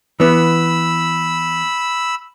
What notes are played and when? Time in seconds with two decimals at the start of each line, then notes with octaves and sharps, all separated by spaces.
0.20 E3 B3 B5 E6